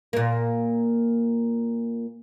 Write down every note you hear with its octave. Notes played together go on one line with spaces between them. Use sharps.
A#2 A#3